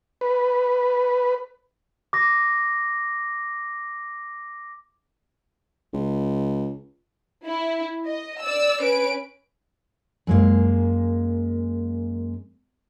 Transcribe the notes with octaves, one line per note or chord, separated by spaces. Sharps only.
B4
D6 A#6
C#2
E4
D#5
D5 E6
C#4 B4 D7
F#2 G#3 A#3